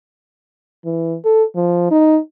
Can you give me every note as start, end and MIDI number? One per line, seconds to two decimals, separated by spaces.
0.85 1.16 52
1.25 1.44 69
1.55 1.90 53
1.91 2.18 63